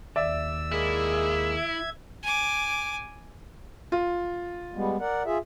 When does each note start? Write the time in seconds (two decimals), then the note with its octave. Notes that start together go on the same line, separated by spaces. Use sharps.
0.16 D#2 D5 E5 E6
0.72 G#3 A#3 E4 G#4
1.56 E5 G#6
2.23 G#5 D6
3.92 F4
4.74 G3 G#3 B3
5.00 A#4 D5 F#5
5.25 F4 G#4 E5